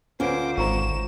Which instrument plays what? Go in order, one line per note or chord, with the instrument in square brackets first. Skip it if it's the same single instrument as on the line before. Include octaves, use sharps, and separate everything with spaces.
[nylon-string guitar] D2 F4 [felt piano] C#4 B4 D7 [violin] C5 D6
[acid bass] G#1 [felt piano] C5 A#5 C#6 [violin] E7